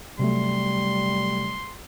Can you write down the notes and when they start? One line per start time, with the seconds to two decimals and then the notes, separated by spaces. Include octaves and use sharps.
0.19 C3 F#3 G3 A3 C6